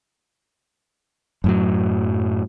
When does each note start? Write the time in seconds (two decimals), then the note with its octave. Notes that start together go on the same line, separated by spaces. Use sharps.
1.44 F#2 A2 F#3